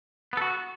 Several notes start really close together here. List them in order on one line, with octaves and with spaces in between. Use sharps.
B3 A4 F#4